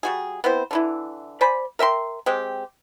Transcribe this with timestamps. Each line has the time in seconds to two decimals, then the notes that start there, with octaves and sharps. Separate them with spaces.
0.03 G3 F#4 G#4
0.44 B3 C4 E4 C5
0.71 D3 E3 E4
1.41 C5 D5 G#5 B5
1.79 A#4 E5 G5 C6
2.26 G#3 C4 G4